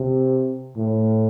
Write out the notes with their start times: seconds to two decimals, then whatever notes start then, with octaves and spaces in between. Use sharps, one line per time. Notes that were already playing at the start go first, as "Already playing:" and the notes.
Already playing: C3
0.77 A2